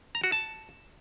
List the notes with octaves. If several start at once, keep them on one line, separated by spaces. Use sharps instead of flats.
A#5
F#4
A5